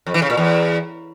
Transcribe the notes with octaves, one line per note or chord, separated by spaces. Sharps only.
F2
E3
C#3
A#2
E2